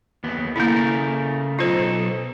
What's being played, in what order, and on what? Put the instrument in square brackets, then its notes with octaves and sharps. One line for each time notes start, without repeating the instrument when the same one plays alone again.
[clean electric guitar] D#2 B3
[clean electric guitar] C#3 A3 A#4 [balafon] A#3 E4
[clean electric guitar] B1 D#4 A4 [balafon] F4 C5